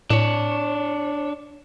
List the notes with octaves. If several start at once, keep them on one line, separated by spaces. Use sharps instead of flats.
A2 D4 C#5